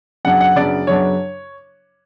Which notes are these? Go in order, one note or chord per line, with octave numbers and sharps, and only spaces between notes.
F#2 C#3 F#3 B3 D4 F#5
F#5
F#2 C#3 F#3 B3 D4 D5
F#2 C#3 F#3 B3 D4 C#5